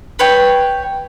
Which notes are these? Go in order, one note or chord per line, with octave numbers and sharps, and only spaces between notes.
B4 C#5 G5